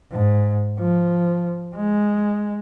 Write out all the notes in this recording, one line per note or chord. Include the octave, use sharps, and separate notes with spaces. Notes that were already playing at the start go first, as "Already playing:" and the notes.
G#2
F3
G#3